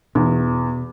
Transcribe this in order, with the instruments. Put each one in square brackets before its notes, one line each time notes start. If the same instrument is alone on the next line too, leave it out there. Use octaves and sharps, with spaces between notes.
[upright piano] E2 [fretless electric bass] B2